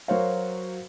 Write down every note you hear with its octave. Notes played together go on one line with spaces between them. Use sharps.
F#3 F#4 A#4 C5 C#5 F5